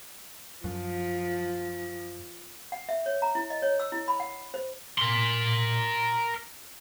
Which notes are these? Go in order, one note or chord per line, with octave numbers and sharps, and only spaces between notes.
F#2 F3
F#5
E5
C#5
A#5
E4
D#5
C#5
E6
E4
B5
F#5
C5
A#4 C6